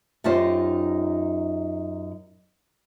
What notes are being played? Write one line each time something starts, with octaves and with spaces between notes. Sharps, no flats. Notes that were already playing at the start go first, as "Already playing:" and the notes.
F#2 D#4 F4 G4 C5